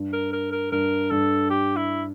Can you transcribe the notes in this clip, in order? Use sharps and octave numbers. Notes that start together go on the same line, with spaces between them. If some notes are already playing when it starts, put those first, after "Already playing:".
Already playing: G2
A#4
A#4
A#4
G2 A#4
G2 A4
G4
E4